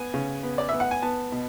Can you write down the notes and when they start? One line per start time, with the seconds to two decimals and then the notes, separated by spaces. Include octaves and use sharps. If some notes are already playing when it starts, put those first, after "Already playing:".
Already playing: B3 G#5
0.14 C#3
0.43 B3
0.58 D5
0.69 B3 E5
0.80 F#5
0.91 G#5
1.02 B3 A5
1.32 B2